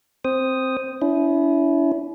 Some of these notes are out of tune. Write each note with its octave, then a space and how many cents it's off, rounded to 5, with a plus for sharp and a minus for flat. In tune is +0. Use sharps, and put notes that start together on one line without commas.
C4 +0 C5 +0 D#6 +0
C#4 +45 E4 +0